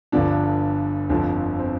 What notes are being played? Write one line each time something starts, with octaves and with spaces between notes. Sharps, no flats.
G1 G2 D3 F3 D4
G1 F2 D3 F3
C4